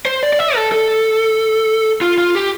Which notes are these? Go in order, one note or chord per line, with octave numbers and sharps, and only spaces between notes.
C5
D5
D5
E5
A4
A4
F4
F4
G4